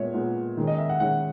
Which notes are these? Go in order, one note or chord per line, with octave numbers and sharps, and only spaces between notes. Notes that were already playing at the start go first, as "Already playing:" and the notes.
Already playing: A#2 G#3 B3 C#5 E5
A#2 G#3 B3
D#3 G#3 C#4
D#5
E5
F#5
D#3 G#3 C#4 F#5